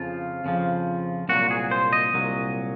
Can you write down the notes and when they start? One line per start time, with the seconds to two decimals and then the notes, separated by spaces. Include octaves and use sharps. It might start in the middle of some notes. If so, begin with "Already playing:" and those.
Already playing: F2 C#3 F3 F4
0.45 F2 C#3 F3
1.29 C2 A#2 F#3 F#4
1.51 G#4
1.71 C5
1.93 D#5
2.14 C2 A#2 F#3